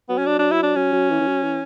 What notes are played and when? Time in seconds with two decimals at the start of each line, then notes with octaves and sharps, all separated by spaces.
0.09 F#3 B3
0.18 C#4
0.26 D4
0.39 D4
0.52 E4
0.63 D4
0.76 F#3 C#4
0.93 F#3
1.10 E3
1.20 E3
1.27 F#3
1.42 E3